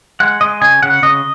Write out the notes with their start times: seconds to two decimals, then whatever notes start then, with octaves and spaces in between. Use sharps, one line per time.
0.20 G#3 F#5
0.41 G#3 D#5
0.61 C#3 G#5
0.83 C#3 F#5
1.03 C#3 D#5